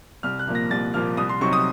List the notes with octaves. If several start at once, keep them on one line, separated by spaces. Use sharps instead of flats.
C2 F6
F#6
A#2 F3 A#3
A#6
C2 A6
A#2 F3 A#3 F6
C2 D#6
C6
C3 F#3 C4 D#4 C#6
D#6